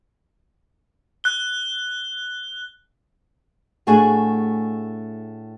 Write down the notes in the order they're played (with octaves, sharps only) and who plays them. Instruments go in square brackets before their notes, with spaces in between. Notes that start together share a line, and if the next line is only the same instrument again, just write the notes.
[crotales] F#6 G7
[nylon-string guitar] A2 A3 D4 F#4 G#4 G#5